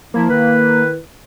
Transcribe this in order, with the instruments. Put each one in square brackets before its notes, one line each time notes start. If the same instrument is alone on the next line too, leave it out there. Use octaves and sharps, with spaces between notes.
[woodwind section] F3 E4 [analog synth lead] A#3
[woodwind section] D#3 E4 B4